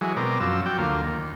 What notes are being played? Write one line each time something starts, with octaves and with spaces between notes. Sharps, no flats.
E3 F#3 G#3
B2 C4 A#4 D5
F#2 F3 E6
F#3 D5 G5
D2 A#3 F4
D#2